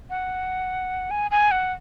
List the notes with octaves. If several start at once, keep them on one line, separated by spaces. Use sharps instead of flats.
F#5
G#5
G#5
F#5